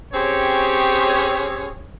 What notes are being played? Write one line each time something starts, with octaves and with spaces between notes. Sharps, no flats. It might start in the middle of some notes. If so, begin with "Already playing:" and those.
C4 C#4 G4 G#4 C#5